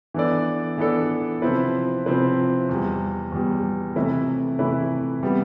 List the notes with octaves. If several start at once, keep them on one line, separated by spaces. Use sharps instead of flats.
E3 B3 D4 A4 D5
E3 B3 D4 A4 D5
C3 F3 C4 E4 B4
C3 F3 C4 E4 B4
E2 B2 G3
E2 B2 G3
C3 E3 A3 E4 B4
C3 E3 A3 E4 B4
C3 G3 B3